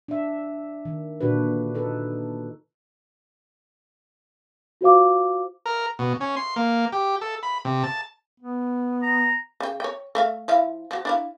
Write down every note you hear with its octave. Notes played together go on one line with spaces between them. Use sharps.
D4 E5
D#3
A#2 D3 D4 F#4 B4
D#4 A4 B4
F4 F#4 C5 F5 D6
A#4
B2
C#4
C6
A#3
G4
A4
B5
C3
A5
B3
A#5
C#3 G5
C#5 G5
A3 E5 F5
F3 E4 F5
F3 F#4
D4 E4 F5